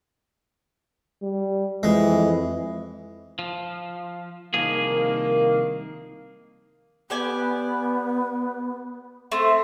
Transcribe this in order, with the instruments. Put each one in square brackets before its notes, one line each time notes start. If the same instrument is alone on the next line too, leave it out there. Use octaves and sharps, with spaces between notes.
[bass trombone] G3
[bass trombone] F2 [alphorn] E3 [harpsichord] G#3
[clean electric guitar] F3
[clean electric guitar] C2 F3 G#4 [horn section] D#3 A#3
[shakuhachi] B3 [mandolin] G4 D5 G#5
[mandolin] A3 C4